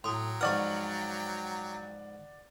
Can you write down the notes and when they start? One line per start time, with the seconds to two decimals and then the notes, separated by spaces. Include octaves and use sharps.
0.04 A2 F#3 G5 A#5 C6 D#6
0.41 G#2 F3 B4 D5 F#5 C#6 F6